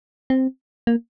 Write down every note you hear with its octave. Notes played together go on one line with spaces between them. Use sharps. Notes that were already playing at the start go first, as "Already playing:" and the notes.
C4
A#3